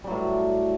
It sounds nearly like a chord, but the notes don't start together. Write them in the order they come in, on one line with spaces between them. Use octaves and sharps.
G3 F#3 A2